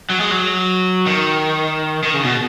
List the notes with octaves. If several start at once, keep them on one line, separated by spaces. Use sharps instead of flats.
F#3
G#3
F#3
D#3
D#3
C#3
B2